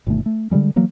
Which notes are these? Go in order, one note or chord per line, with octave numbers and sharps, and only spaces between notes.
G1 B2 D#3 A3
A3
D3 D#3 G3 G#3
E3 F#3 A#3